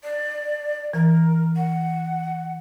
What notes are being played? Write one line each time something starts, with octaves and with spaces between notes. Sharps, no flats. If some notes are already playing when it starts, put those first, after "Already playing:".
D5
E3 A#4
F#5